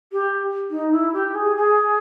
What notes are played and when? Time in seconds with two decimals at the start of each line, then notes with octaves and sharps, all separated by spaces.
0.12 G4
0.70 D#4
0.92 E4
1.13 G4
1.35 G#4
1.56 G#4